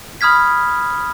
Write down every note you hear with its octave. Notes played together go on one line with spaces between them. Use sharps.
B5 D#6 F6 G#6 B6